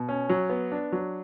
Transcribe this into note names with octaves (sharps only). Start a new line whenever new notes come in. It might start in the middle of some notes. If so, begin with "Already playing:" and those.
Already playing: B2
C#4
F#3
B3
D4
F#3